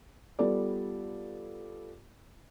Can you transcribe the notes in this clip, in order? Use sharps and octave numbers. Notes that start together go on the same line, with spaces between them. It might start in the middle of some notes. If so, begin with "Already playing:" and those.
G3 B3 F4 A4 B4 D5